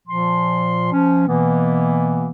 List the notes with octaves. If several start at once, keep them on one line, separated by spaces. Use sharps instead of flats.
A#2 F3 C6
F3 C#4
B2 E3 A#3 B3